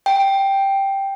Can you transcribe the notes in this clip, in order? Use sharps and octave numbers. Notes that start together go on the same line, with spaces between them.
G5